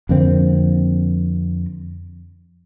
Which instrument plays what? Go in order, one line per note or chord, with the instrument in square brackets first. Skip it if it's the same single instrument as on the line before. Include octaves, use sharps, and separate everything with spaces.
[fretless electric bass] F2 D3 A#3 C4